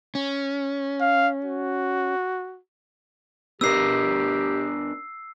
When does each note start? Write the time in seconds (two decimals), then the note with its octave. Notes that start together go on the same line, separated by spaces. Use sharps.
0.15 C#4
1.01 F5
1.45 F#4
3.61 B3 D4 G4 A#4 E6 C7